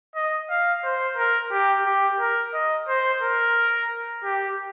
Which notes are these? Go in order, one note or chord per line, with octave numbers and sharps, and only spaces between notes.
D#5
F5
C5
A#4
G4
G4
A#4
D#5
C5
A#4
G4